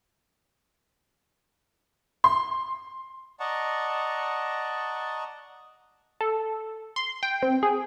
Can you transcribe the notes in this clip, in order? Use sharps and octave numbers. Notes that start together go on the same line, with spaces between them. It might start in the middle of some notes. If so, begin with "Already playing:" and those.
C6
D5 D#5 F#5 A5 A#5 C#6
A4
C6
G5
C4
G#4